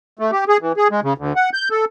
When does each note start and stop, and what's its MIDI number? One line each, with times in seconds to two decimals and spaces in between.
0.19 0.31 57
0.32 0.44 67
0.48 0.57 68
0.61 0.72 52
0.77 0.88 68
0.91 1.00 56
1.03 1.13 49
1.18 1.33 38
1.36 1.50 78
1.53 1.69 91
1.71 1.85 69